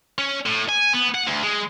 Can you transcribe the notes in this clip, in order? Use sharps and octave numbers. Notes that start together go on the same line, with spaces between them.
C#4
A2
G#5
B3
F#5
D2
G#3